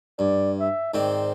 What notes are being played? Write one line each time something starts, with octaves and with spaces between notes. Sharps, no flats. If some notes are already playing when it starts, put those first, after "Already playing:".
G2 D5
E5
G#2 D#3 C4 D5